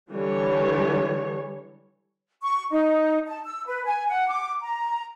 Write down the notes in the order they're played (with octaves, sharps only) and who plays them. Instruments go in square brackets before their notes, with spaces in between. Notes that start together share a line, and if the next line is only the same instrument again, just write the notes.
[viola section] D3 E3 G3 C#5
[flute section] C#6
D#4
A5
E6
B4
G#5
F#5
D6
A#5